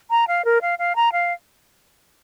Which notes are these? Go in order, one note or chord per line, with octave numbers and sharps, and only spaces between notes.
A#5
F5
A#4
F5
F5
A#5
F5